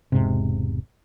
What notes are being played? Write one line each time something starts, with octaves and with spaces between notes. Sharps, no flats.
E1 G#2 C3